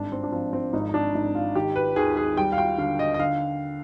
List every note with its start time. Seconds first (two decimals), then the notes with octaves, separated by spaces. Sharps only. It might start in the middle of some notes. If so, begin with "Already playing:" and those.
Already playing: G#1 G2 D4
0.12 C4
0.23 D4
0.32 F3 C4
0.53 C4
0.73 G#1 D#4
0.89 D#4
0.94 D4
1.14 G#1 D#4
1.35 F4
1.55 D#3 G4
1.76 B4
1.96 D#2 G#4
2.17 G#4
2.37 G3 G5
2.52 F5
2.58 G5
2.78 D3 F5
2.99 D#5
3.14 D#5
3.19 D3 F5